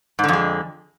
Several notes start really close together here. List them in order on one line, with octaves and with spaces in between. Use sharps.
G#2 D3 F2 G#3